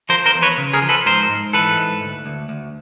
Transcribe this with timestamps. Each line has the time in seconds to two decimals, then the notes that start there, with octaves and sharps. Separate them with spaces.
0.09 F3 A#4 C5
0.26 A#4 C5
0.34 E2
0.42 B4 C#5
0.58 C#3
0.73 G#4 A#4
0.82 F3
0.89 A4 B4
1.06 G#2 A#4 C5
1.29 G#2
1.53 E3 A4 B4
1.77 G#2
2.02 D2
2.26 D2
2.49 D2